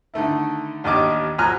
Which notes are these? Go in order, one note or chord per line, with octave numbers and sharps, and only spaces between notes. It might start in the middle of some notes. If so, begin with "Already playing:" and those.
D3 D#3 A3 E4
A1 D#2 D4 D#5 D6 F6
B1 F3 G#5 A#5 F6 F#6